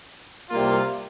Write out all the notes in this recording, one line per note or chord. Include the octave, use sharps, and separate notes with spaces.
C2 C3 G3 A#3 F4